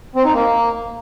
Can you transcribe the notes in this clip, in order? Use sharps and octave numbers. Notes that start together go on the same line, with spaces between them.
C4
D#4
A#3